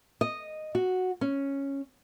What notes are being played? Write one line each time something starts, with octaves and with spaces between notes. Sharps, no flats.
D#5
F#4
C#4